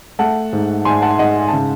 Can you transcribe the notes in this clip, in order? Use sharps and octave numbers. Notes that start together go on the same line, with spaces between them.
A3 F#5 A5
G#2
G#2 G#5 C6
F#5 A5
G#2 D#5 F#5
G#5
C#3 A5